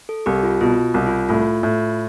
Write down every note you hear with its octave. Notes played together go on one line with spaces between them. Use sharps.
A4
C2 G4
F4
B2 F4
C2
F4
A2 F4
A2